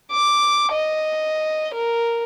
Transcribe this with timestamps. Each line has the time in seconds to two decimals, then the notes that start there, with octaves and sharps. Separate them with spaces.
0.11 D6
0.73 D#5
1.74 A#4